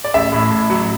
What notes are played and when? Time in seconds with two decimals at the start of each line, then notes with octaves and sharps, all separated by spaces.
0.04 D5
0.14 A1 E5
0.32 A2
0.51 A2
0.70 F#3